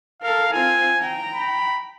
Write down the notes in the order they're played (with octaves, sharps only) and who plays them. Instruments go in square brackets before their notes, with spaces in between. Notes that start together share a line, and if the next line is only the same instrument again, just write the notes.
[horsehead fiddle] A4 A#4 [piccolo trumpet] F5
[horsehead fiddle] C4 F4 [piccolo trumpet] G#5
[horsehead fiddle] G5 A#5
[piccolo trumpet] B5